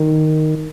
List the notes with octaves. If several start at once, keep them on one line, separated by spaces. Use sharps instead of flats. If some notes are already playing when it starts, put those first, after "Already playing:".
Already playing: D#3